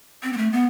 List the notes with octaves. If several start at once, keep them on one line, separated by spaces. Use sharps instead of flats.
C4
B3
A3
B3